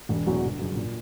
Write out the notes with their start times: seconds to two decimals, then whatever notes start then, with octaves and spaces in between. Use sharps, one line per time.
0.09 E1
0.26 E2 B2 F#3
0.42 G1
0.59 F#2 C#3
0.75 A#2